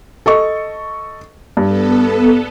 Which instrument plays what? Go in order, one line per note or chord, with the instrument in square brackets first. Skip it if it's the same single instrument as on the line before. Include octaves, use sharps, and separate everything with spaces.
[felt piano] A4 D#5 C#6
[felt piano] G2 [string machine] B3 A4